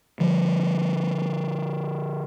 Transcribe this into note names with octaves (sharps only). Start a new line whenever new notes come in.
D3 F3 G3